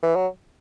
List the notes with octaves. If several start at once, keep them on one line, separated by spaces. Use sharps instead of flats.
E3
F#3